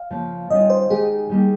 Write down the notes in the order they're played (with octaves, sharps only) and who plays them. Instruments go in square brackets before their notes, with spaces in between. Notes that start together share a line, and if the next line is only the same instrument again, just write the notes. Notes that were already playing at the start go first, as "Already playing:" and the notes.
Already playing: [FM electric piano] F5
[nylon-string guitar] C#3 F3 A#3
[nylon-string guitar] D#3 G3 C#4 F4 [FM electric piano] D#5
[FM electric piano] C5
[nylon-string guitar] D#3 G#3 D#4 G4 [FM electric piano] G#4
[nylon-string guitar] D#3 G3 A#3